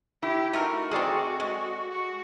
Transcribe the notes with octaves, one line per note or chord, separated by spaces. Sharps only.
E4 G4
A3 D#4 F#4 A#4
G#3 C4 G#4 A4 D5
G#3
F#4